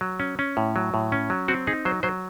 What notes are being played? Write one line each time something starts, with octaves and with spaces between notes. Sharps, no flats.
F#3
C#4
C#4
A2
F#3
A2
C#4
F#3
C4 F#4
D#4 G#4
F#3 C5
F#3 C5